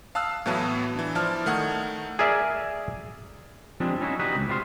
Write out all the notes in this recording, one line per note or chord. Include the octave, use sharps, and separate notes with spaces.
F5 A5 D#6 E6 F#6
A2 E3 F#3 B3 A5 D#7
E3 D4
F3 E4 D5 A5 F6
D#3 A3 F#5 D#6 G#6
G#4 A#4 D5 E5
F3 G3 G#3 C4 D4
C#4 D#4 E4 F#4
G3 D#4 F#4 B4
C#2
C2 C3 G3 F4 C6